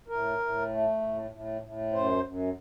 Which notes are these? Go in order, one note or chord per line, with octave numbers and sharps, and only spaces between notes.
A2 A#4
A2
A3
A2
A2
A2
F#2 C5
F#2